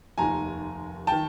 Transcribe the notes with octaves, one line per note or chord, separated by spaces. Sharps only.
F1 D#2 D#3 G#5 A#5
D#3 G5 A5